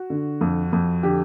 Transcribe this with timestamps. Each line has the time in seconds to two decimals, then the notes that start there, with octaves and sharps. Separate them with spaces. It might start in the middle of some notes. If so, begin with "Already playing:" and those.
Already playing: F#4
0.10 D3
0.41 F2
0.73 F2
1.03 D3 G4